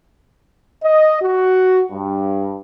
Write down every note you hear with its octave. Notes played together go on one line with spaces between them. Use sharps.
D#5
F#4
G2